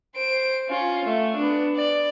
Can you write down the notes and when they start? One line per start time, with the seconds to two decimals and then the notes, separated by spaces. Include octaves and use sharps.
0.15 C5 D7
0.69 C#4 F4
1.05 A3
1.36 B3 D4
1.76 D5